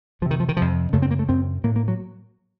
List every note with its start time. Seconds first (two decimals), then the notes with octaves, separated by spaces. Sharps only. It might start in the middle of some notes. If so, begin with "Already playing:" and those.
0.22 F2 F3
0.25 C3
0.31 D#3
0.40 F3
0.49 D#3
0.57 F2 C3 F3
0.93 F#2 C#3 A3
1.02 C4
1.11 A#3
1.19 A3
1.28 F#2 C#3 C4
1.64 A2 A#3
1.76 A#3
1.88 F#3